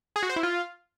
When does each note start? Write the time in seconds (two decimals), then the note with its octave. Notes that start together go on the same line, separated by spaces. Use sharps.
0.16 G#4
0.23 F#4
0.29 C5
0.36 E4
0.43 F4